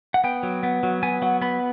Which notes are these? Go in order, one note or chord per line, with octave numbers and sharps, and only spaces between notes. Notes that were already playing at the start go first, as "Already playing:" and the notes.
F#5
B3 G5
F#3
B3
F#3
B3 G#5
F#3 F#5
B3 B5